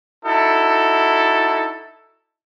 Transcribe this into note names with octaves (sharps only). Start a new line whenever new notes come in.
D#4 E4 F#4 A4